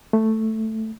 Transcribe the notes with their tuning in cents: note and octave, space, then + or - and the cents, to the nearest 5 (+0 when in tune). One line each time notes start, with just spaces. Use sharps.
A3 +5